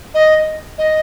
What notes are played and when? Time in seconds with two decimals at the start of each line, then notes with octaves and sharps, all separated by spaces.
0.14 D#5
0.78 D#5